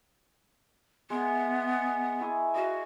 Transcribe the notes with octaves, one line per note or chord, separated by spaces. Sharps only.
G#3 B3 E5
E4 G#4 C#6
F#4 D#5 F5